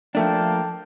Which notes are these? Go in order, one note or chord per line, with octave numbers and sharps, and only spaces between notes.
F3 A3 A#3 D4 G5 A5